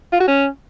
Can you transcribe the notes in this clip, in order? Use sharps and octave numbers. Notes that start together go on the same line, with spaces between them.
F4
F#4
C#4